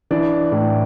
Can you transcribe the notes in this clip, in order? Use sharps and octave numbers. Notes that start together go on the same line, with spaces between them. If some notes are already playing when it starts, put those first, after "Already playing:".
E3 D4 D5
A2